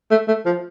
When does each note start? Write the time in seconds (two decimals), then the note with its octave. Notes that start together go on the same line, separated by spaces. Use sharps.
0.11 A3
0.28 A3
0.46 F3